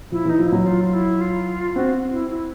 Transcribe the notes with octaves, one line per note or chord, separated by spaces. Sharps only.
F3 E4
E3 D#4
F3
F#3 E4
F4
F4
E4
F4
C4 F#4
E4
E4